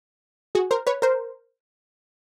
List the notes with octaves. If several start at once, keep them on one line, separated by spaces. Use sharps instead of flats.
F#4 G#4
A#4 C5
B4 C#5
A#4 C5